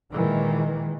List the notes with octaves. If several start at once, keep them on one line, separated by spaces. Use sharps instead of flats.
A#2 D#3 E3 G#3